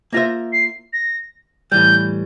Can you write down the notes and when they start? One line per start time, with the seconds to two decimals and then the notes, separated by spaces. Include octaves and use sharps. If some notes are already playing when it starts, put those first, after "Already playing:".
0.13 A#3 F4 C5 E5 A#6
0.53 C7
0.93 A#6
1.71 A2 E3 G3 G6